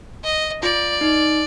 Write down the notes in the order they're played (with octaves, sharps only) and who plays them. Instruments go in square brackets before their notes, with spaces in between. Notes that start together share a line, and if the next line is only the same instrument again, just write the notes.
[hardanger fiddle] D#5
[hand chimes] F4 [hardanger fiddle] D5
[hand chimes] D#4